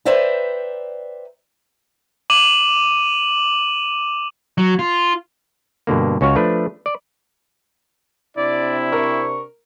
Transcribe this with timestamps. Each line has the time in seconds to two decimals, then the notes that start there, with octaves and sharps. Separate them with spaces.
0.05 B4 C5 D5 E5 G5 A#5
2.30 D6 D#7 E7 F#7
4.58 F#3
4.79 F4
5.87 G2 B2 D3 A#3
6.21 C#2 C#4 F#4 C#5 F5
6.36 F3 A3 D4 B4
6.86 D5
8.37 C3 C4 D4 E4 D5
8.93 A#4 C#6